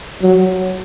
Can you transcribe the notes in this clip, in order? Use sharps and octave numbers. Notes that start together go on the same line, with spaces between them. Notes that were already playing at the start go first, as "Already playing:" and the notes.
F#3